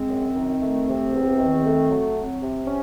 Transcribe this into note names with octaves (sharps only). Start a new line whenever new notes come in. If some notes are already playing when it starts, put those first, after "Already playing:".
Already playing: G#3 C4
F#2
D#3
A3
C3
E2
D#3
A3
F#3
C4
C3
C#4